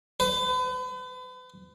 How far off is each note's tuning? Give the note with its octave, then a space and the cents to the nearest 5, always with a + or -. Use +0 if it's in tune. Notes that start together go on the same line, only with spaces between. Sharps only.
B4 +40